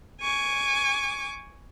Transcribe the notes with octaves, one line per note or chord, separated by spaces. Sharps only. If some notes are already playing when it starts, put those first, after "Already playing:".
G#5 C#6 D6